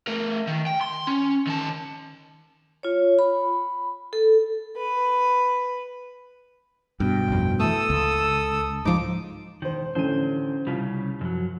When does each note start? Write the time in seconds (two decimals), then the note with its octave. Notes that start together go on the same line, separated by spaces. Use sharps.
0.07 A3 A#4
0.47 D#3
0.66 G5
0.81 C6
1.07 C#4
1.47 D#3 A5
2.83 F4 C#5
3.19 B5
4.13 A4
4.75 B4
7.00 G2 B2 G5
7.28 A1 F2
7.60 E3 A3 A4 D#6 E6
7.90 C#2
8.85 G#2 F3 D#4 D6
9.62 E1 D#3 C5
9.95 A1 D3 C#4 C5 D#7
10.67 C2 C#3 G3 F4 B6
11.21 F#2 F3 F#3